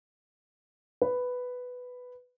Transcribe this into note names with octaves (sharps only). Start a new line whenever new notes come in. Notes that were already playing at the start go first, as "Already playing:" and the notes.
B4